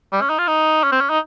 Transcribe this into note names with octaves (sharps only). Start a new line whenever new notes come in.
G3
C#4
D#4
F4
D#4
C#4
C4
C#4
D#4